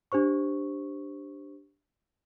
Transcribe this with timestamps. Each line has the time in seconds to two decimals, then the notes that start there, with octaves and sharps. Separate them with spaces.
0.12 D4 G4 C5 C#6